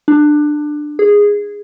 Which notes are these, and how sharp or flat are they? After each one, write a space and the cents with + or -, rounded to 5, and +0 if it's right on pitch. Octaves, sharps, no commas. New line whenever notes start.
D4 +20
G#4 -10